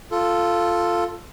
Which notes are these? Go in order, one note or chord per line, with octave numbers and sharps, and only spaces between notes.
F4 A4